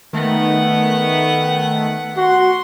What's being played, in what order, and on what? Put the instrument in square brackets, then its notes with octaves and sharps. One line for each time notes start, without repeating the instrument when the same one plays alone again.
[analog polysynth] D#3 A3 [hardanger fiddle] B3 F#5
[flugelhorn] F#4 [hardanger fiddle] C6